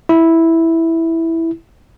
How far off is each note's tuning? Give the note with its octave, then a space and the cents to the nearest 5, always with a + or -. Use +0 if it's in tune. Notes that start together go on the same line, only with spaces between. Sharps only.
E4 -5